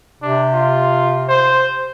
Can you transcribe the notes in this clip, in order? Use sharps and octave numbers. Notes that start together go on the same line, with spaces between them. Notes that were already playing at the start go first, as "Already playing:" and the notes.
C3 D4
F4
C5